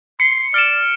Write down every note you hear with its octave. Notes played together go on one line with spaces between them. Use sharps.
C6 C#7
D5 F6 D7 E7